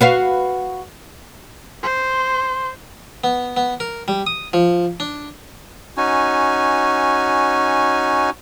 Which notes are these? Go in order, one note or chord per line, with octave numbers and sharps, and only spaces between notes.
F#4 B4 F5
C5 C6
B3
B3
A#4
G3
D#6
F3
D4
C#4 D#4 F#4 G#5